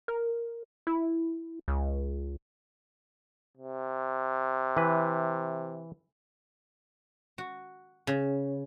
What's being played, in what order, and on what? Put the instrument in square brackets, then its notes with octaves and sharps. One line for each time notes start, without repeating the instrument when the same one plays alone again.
[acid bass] A#4
E4
C#2
[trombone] C3
[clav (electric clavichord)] E3 B4
[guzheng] F#4
C#3